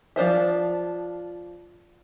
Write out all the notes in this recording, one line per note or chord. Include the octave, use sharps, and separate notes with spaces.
F3 D4 C5 E5